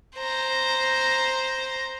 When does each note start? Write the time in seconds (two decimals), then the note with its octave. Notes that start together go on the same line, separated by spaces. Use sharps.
0.16 C5 A#5